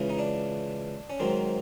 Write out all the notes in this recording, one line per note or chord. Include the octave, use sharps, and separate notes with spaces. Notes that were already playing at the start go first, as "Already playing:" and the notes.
Already playing: C#2 C#3 E3
D#4
D4
C#4
G#2 D#3 F#3 C4